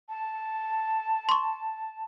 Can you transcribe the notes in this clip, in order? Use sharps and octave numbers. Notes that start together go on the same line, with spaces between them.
A5
C6 C#6